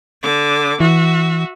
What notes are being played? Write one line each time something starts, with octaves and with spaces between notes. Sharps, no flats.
D3 D6
E3 F#4 E5